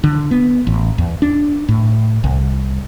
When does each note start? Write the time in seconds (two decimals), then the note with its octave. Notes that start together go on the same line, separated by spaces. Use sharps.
0.04 D3
0.31 B3
0.67 A1
0.98 E2
1.22 D4
1.69 A2
2.24 C2